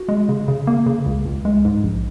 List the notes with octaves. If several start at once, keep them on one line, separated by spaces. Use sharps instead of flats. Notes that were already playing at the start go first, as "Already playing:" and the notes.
Already playing: F#4
G#3
C#3
C#3
A#3
C#3
C#2
C#2
G#3
G#2
A#1